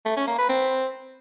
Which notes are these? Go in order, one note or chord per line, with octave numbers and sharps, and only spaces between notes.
A3
C#4
A#3
B4
C4